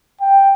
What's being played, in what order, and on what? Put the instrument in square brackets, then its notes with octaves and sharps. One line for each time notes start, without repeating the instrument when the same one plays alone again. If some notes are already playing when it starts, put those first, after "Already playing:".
[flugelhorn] G5